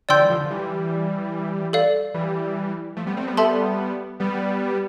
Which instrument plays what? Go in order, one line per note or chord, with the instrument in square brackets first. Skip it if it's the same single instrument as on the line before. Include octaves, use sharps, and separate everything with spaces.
[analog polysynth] D3 F3 [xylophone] D5 G5 C6 E6 G6
[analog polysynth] E3 G3
D3 F3
D3 F3
E3 G3
[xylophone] A4 D5 F5
[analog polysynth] E3 G3
F3 A3
G3 B3
A3 C4
G3 B3
[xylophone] A4 E5 A5 C6
[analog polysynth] G3 B3